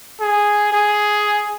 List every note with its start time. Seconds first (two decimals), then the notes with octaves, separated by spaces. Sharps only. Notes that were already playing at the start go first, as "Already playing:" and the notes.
0.20 G#4
0.73 G#4